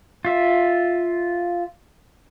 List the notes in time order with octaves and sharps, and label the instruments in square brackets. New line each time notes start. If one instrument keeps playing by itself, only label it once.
[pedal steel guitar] F4 E5